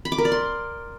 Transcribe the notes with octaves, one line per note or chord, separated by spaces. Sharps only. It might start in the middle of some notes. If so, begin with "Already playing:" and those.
B5
D6
A#4
D5
C6